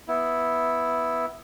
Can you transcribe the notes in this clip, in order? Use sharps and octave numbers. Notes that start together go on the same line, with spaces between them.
B3 E4